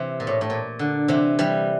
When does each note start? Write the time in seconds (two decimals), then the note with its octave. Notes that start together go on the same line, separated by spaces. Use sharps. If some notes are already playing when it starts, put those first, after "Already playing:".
Already playing: C3 E3
0.20 A#2
0.27 A2
0.41 A2
0.50 A#2
0.79 D3
1.08 C3 E3
1.39 E3 G3